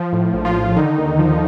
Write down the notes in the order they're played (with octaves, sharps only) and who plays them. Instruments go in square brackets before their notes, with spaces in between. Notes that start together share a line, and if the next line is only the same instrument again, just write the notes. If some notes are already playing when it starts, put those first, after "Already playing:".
Already playing: [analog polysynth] F3
A2
A#1
F3 F4
F3
D3 D#3 D#4
D#2
F3